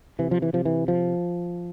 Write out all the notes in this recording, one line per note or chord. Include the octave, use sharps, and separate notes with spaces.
C3 E3
F3
E3
C3 F3
E3
F3